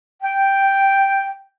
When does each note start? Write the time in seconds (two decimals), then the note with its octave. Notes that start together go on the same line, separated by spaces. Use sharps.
0.23 G5